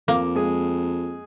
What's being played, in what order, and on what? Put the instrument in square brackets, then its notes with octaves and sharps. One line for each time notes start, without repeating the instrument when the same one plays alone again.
[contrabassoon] F2 [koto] A#3 [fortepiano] D6
[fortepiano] G#3 G#4